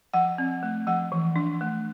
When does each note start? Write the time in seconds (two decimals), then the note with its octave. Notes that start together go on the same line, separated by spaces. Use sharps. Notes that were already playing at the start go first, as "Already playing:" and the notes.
0.13 F3 F#5
0.38 C4
0.63 A3
0.87 F3 F#5
1.12 E3
1.36 D4
1.61 A3